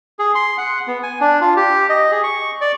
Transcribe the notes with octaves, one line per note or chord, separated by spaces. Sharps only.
G#4
C6
F#5
B3
G#5
D4
F4
G4
D#5
G#4
C#6
D5